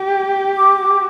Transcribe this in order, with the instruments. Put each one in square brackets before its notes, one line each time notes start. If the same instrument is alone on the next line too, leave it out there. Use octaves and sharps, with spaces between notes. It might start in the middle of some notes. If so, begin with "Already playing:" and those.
Already playing: [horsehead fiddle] G4
[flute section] D6